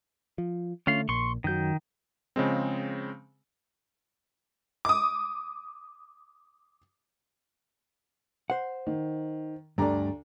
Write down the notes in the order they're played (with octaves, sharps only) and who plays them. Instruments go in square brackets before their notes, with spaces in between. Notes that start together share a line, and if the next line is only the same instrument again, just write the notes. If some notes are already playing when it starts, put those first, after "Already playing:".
[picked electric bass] F3
[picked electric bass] D3 A3 [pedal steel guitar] C#4 F4 F5
[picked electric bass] A#1 A#2 [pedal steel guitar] C6 C#6
[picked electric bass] F#2 F#3 [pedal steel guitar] D#3 G6
[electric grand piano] C#3 F3 G#3 C4
[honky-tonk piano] D6 D#6
[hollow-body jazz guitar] C5 F#5
[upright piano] D#3
[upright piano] D2 D5 A#5 [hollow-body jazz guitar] G2 A3